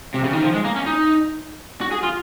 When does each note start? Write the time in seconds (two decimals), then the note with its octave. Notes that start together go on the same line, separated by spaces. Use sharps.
0.14 C3
0.24 C#3
0.33 D#3
0.43 F3
0.54 G#3
0.64 A#3
0.76 C#4
0.86 D#4
1.81 F#4
1.91 G#4
2.03 F4